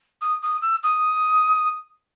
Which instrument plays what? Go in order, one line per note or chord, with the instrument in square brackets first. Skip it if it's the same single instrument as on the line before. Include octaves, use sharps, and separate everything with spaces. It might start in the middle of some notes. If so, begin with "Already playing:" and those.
[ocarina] D#6
D#6
E6
D#6